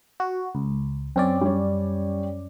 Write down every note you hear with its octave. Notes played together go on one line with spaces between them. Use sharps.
F#4
C#2
F#2 C4 C#4 D5
G3 C#5